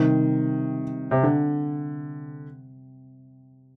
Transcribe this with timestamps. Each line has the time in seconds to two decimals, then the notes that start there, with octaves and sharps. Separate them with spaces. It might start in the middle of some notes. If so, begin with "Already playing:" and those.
Already playing: C3 D#3 G3 C4
1.11 C3
1.23 D3